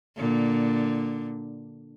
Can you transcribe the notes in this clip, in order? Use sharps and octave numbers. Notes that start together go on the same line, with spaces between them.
A#2 D3